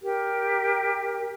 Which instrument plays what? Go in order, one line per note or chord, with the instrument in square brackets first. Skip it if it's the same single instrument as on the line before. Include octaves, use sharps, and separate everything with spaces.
[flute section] G4 A#4